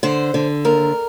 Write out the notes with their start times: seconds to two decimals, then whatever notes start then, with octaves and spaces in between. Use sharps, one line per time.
0.03 D3 C5
0.34 D3
0.65 D#2 A#4